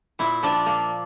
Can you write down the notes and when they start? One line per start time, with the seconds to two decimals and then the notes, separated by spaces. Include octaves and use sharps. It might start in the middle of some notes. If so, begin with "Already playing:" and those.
0.19 A#2 E4
0.43 F3 D4
0.66 A#2 A#3